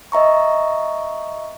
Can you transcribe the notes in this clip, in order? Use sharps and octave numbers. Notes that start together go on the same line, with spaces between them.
D#5 E5 A#5 C#6